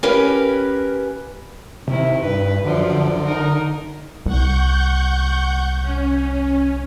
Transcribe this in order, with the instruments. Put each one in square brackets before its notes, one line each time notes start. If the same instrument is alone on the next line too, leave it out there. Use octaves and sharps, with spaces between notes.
[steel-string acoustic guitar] C#4 G4 A#4 B4 F5
[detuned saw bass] C3 [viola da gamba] D#3 E4
[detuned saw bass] G2 [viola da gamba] B4
[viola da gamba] F#2 F3 D5 [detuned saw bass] D3
[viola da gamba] D#4 A#4
[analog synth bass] C2 [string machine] F#5 C#6 G6
[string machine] C#4